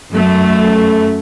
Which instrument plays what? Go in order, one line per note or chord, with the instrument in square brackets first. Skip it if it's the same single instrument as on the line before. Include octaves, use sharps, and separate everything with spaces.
[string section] F#2 A3